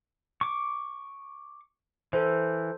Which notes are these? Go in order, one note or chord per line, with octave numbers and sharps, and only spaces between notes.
C#6 D6
E3 A4 C5